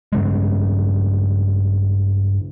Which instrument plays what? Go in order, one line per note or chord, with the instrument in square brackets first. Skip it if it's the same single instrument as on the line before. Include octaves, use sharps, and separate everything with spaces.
[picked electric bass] G2 C#3 G#3